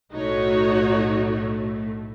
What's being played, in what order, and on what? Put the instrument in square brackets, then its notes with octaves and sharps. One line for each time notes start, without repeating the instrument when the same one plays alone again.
[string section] B1 A2 A3 [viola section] D#4 F#4 C#5